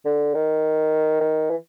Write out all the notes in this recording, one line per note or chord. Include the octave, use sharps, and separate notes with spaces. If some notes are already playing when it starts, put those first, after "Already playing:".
D3
D#3
D#3
E3